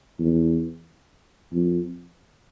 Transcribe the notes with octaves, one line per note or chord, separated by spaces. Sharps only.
E2
F2